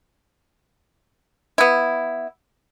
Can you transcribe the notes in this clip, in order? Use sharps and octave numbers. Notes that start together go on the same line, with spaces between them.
B3 E4